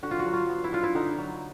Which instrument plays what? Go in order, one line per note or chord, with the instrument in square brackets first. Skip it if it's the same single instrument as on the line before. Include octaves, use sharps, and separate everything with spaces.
[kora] D3 F#4
F4
F#4
F#3
F4
B3
E4
D4 F4
E4
D3 D#4
F#3